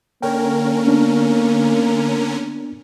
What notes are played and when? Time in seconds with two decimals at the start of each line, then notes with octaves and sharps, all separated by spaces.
0.22 D3 A#3 C#4 A#4 G5
0.87 B3 D4